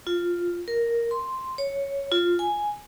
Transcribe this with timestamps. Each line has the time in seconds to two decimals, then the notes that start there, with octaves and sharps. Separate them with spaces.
0.07 F4
0.68 A#4
1.11 C6
1.58 C#5
2.12 F4
2.39 G#5